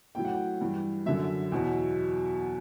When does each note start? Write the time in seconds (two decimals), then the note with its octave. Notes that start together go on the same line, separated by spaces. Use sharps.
0.15 A2 F#3 G5
0.25 F#5
0.34 G5
0.61 G2 E3 G3
1.06 F#2 D3 F#3 E5
1.52 E2 B2 F#3